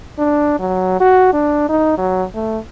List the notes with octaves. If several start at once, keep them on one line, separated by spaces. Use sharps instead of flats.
D4
F#3
F#4
D4
D#4
F#3
A3